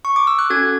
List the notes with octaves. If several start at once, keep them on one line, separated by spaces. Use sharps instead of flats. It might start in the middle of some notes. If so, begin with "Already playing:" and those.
C#6
D6
E6
F#6
C#4 F#4 A4 G#6